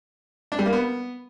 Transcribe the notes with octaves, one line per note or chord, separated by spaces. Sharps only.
D4
G3
A#3
B3